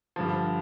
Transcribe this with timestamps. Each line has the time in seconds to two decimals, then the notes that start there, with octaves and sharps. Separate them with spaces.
0.16 G2 D3 F3